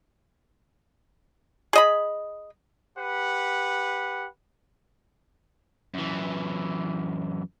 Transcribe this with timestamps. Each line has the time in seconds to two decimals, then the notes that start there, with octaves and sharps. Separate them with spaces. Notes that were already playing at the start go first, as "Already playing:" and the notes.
1.73 G#4 D#5 B5
2.98 G4 B4 F#5
5.94 F#2 E3